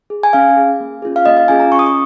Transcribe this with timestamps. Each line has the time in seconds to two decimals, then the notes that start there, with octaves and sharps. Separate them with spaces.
0.10 G#4
0.23 G#5
0.33 C#4 F5
0.56 G#4
0.80 A#3
1.02 C#4 F4 G#4
1.16 F5
1.26 A#3 D#5
1.37 F5
1.48 C#4 F4 G#4 G#5
1.60 A#5
1.72 C#4 C#6
1.79 D#6
1.86 C#6